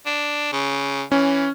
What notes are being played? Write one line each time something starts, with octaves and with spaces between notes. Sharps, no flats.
D4
C#3
E3 C#4